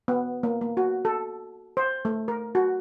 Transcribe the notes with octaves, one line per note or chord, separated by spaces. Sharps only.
B3
A#3
A#3
F#4
A4
C5
A3
A#4
F#4